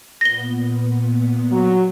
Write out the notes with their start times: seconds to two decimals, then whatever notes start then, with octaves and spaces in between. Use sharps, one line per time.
0.21 A#2 B3 A#6 G7
1.51 F#3